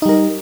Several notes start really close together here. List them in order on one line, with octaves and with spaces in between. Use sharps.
D#4 G3 A#4